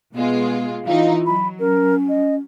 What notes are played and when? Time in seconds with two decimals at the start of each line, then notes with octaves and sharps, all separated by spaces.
0.14 B2 G#3 B3 F4
0.86 E3 D#4 F4 F5
1.26 F#3 B5
1.60 C#4 A#4
2.09 D#5